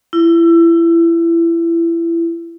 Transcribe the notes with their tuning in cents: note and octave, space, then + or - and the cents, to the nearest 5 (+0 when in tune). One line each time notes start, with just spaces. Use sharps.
E4 +25